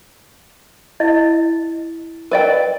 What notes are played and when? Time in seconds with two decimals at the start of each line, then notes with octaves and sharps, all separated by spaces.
1.00 E4 D#5
2.31 A#4 B4 D5 D#5 G5 A#5